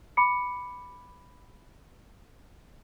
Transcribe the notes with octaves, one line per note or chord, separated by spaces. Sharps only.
B5 D6 C#7